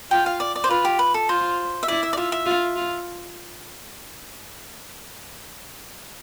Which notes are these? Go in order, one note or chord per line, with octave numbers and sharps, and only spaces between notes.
F4 G5
F5
D5
D5
C5
F4 B4
G4
B4
A4
F4 C5
E5
E4 D5
E5
D5
F4 E5
E5
F4
F4